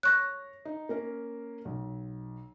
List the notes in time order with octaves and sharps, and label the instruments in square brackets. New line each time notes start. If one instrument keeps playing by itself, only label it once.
[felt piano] C#5 A#6 [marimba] C#6 F#6
[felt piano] D#4
A#3 C#4 A#4
B1